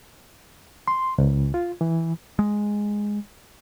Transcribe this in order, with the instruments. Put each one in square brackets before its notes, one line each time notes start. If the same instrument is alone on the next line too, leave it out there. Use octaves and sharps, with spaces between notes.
[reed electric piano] C6
C#2
F4
E3
[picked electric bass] G#3